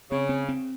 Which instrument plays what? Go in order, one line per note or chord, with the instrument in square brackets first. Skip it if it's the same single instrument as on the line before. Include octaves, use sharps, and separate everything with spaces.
[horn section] C#3 [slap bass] C4
[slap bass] C4
C4